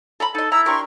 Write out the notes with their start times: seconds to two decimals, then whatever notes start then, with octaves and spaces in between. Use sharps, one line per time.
0.20 A4 A#5 B5
0.35 D#4 A4 D#5
0.52 E4 A#5 E6
0.66 D4 G4 A#4 A#5 C6 C#6